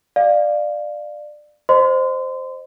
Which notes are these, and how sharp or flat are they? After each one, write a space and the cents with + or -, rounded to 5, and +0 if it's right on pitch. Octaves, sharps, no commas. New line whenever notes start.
D5 +20 F5 +0
C5 +0 D#5 -35 C6 -30